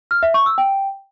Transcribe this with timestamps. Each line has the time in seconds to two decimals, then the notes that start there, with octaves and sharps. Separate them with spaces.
0.11 F6
0.23 E5
0.34 C#6
0.46 E6
0.58 G5